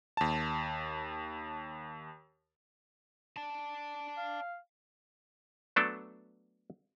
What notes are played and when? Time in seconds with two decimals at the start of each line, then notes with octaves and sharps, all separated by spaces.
0.17 D#2 A5
3.37 D5 A5
4.17 F5
5.76 F#3 A3 B3 D4 A4